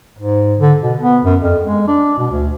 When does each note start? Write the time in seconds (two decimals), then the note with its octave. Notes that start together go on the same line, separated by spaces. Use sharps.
0.19 G#2
0.59 D3
0.82 B2
1.01 B3
1.25 F#2
1.41 F2
1.64 G#3
1.87 D4
2.18 B2
2.31 D2